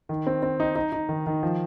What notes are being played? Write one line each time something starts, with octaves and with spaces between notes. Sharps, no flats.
D#3
C4
C4
D#4
D#4
D#4
D#3
D#3
F3